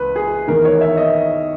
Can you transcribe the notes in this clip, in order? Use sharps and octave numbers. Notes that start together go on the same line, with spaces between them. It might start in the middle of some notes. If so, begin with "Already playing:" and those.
Already playing: C#2 E3 B4
G#4
E2 D#3 A#4
C#5
E5
D#5